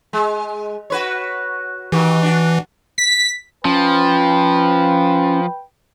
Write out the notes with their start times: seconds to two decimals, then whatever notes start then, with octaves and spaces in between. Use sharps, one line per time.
0.13 G#3
0.90 F#4 B4 C#5
1.92 D#3 E3 F#4 G4
2.22 D4 F#4
2.98 B6
3.65 F3 C#4 B4 G5